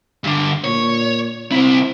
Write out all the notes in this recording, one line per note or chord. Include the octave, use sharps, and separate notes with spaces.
G2 D3
A#2 C#5
C2 C4 E4